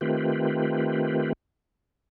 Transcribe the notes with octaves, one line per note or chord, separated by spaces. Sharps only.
D#3 A3 C4 F4 G4 B4